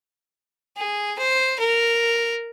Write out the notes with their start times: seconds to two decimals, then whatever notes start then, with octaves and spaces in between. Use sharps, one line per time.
0.77 G#4
1.19 C5
1.59 A#4